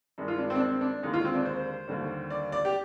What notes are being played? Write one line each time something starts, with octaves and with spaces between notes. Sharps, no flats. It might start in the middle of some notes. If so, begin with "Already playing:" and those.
G2 D#3 G#3
F4
D4
C4
D4
C4
D4
D#2 D3 G#3 D#4
F4
C4
D4
C5
D#2 D3 G3
D5
D5
G4